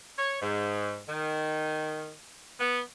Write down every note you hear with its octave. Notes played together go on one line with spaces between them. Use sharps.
C#5
G#2
D#3
B3